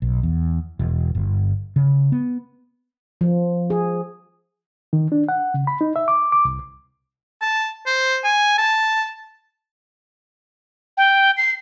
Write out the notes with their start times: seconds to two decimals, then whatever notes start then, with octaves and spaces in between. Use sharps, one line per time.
0.02 B1
0.23 E2
0.79 E1
1.15 G1
1.76 C#3
2.12 B3
3.21 F3
3.70 G#4
4.93 D#3
5.12 D4
5.29 F#5
5.54 C#3
5.67 B5
5.81 D#4
5.96 E5
6.08 D6
6.32 D6
6.45 C2
7.41 A5
7.86 C5
8.24 G#5
8.58 A5
10.97 G5
11.37 C7